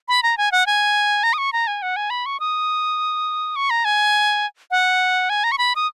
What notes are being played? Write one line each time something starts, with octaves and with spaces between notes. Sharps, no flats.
B5
A#5
G#5
F#5
G#5
A#5
D#6
C#6
A#5
G#5
F#5
G#5
B5
C#6
D#6
C#6
A#5
G#5
F#5
G#5
A#5
C#6
B5
D#6